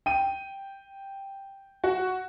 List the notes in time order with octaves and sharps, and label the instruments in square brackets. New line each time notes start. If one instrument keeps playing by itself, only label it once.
[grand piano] G5 D#7
[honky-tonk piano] F#4